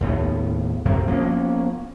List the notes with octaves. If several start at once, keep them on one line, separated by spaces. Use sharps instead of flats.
D#2 A2 B3
F#2 C3 F#3 C4
F3 A#3 B3 C#4